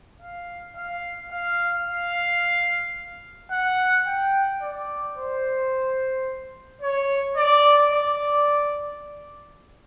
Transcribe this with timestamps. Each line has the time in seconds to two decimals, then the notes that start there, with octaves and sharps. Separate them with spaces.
0.21 F5
0.76 F5
1.32 F5
1.86 F5
3.51 F#5
4.07 G5
4.62 D5
5.16 C5
6.82 C#5
7.37 D5
7.92 D5